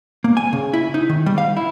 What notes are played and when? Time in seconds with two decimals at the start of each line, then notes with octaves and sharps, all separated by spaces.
0.24 A#3
0.37 G#5
0.53 C#3
0.73 E4
0.94 D#4
1.09 D#3
1.26 G3
1.38 F5
1.57 E4